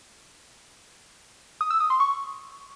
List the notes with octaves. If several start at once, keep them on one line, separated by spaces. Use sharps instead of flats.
D#6
E6
D#6
C6
C#6